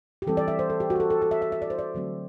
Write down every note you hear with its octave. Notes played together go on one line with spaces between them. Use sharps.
G4
E3 G3 C4 A4
D5
E5
C5
A4
G4
F#4
G4
A4
A4
A4
E5
E5
E5
D5
C5
D5
D3 F#3 A3 C4